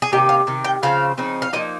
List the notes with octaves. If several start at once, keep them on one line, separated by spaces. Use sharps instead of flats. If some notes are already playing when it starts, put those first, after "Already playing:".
G#4
C3 D#3 A#3 D#4 G4
F5
C3 D#3
G5
C#3 F3 C4 F5
C#3 F3 C4 D#4
F5
F3 A#3 D#4 D#5